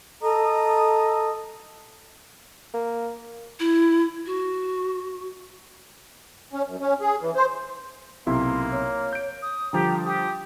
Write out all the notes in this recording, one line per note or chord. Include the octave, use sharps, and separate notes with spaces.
A4 D#5 A#5 D#6
A#3
E4
F#4
C#4
F#2
C#4
G#4
E3
C5
B1 C3 A#3 E4 C6
C#5
G6 D7
D#6
D3 F3 G3 G4 A#5
G4 D#6